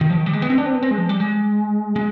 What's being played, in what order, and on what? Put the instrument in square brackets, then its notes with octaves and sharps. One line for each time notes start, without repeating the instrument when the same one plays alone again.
[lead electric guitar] D#3
F3
D#3
G3
G#3
B3
C4
D4
C4
B3
C4
G#3
F3
G3
G#3
G#3